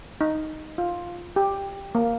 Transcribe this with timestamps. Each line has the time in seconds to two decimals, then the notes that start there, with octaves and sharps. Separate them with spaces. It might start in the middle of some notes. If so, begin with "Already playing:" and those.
0.21 D#4
0.78 F4
1.36 G4
1.95 A#3